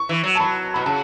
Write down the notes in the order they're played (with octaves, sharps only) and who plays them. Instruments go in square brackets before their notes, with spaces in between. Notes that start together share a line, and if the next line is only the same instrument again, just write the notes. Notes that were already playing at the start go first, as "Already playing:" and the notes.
Already playing: [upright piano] C#6
[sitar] E3
F#3
[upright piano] A5
[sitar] F#3 [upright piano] B5
[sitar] B2 [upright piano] B5
[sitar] C#3 [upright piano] A5